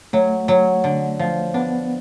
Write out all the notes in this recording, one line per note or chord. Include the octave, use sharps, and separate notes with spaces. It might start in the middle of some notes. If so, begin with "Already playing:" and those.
F#3 A3
F#3
D3
F3
B3 D4